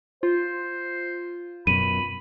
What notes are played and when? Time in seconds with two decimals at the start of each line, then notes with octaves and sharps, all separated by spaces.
0.23 F4 C5
1.67 F#2 B2 B5 D#7